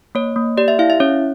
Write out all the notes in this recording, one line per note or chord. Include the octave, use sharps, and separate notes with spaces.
A#3 C#5
A#3
G4 D5
E5
E4 F5
E5
C#4 C#5